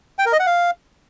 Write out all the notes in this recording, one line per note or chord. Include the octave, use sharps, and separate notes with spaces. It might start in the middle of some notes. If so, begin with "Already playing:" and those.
G5
A#4
D#5
F#5
F5